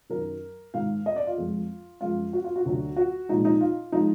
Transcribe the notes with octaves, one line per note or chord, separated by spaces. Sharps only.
F#2 D#3 F#3 A#4
G#2 D#3 G#3 F5
D#5
D5
F4
F2 F3 G#3
F#2 F3 G#3 F4
F#4
F4
F#4
D2 D3 F#3
F#4
A#2 F3 G#3 D#4
D#4
F4
F3 G#3 D#4